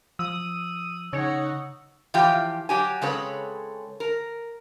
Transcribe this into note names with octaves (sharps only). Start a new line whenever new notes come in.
F3 D#6 E6
C#3 D#4 C#5 F#5
E3 F3 F4 G4 G5
F#3 G4 G#5
C#3 G#3 C4 A4 B4 C#5
A#4